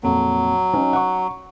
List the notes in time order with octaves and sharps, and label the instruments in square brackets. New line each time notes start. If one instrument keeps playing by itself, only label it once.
[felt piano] F2 A#2 [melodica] F#3
[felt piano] C#4 D#4
F#5 C#6